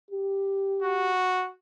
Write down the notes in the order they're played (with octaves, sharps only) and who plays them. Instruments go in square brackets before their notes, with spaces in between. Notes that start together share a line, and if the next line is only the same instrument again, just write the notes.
[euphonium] G4
[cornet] F#4